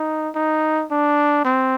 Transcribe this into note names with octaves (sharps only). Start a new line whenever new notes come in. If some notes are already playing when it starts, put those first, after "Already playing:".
Already playing: D#4
D#4
D4
C4